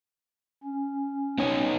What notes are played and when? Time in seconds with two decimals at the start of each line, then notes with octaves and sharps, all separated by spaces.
0.64 C#4
1.38 B3 D#4 C#5